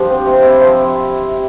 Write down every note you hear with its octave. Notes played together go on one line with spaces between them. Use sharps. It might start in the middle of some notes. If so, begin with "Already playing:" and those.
Already playing: F3 G3 D4 G4
C4
C3
C3 E4
F3